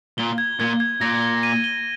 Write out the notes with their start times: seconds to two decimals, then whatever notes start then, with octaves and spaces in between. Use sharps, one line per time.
0.18 A#2 G7
0.38 G#6
0.59 A#2 G#6
0.80 G#6
1.01 A#2 A#6
1.22 G7
1.43 D#7
1.64 G7